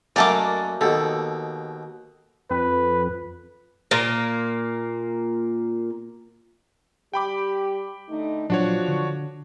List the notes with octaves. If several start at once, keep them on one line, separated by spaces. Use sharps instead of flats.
F#2 F#3 A3 A#3 D5 D#5 A5 D6
D#2 B2 A4
F2 B4
A#2 A#3
G3 G4 G5 B5 D6
D3 A3 D#4
A#2 F3 F#3 D4 F#4 C#5
D3